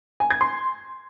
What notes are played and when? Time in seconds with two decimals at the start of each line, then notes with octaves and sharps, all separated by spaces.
0.20 G#5
0.30 G#6
0.41 C6